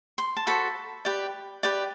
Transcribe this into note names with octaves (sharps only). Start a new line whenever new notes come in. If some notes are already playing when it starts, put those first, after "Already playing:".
C6
A5
F#4 A4 C5 B5
G4 B4 D5
G4 B4 D5